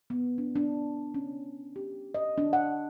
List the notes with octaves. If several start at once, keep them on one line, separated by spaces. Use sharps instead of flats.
B3
D4
D4
C#4
G4
D#5
D4
F#5